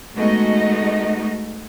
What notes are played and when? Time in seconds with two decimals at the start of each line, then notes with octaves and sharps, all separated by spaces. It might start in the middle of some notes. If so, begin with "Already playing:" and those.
0.15 G#3 A3 B3 D#4 F#4 D#5